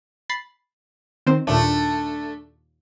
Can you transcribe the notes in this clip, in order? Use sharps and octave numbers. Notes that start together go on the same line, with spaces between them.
B5 A6 C7
D#3 C4 C5
D#2 A#2 A3 D4